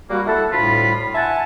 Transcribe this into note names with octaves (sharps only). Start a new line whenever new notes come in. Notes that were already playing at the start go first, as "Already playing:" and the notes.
G3 A#3 F#4
E4 A4 E5 F#5 A5
D2 A2 G3 F4 B5
E5 F#5 G#5 A5